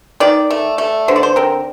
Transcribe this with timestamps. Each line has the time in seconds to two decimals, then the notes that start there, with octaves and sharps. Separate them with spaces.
0.20 D#3 D5
0.50 A3
0.78 A3
1.08 D3 C5
1.16 D5
1.23 C5
1.36 C4 A#4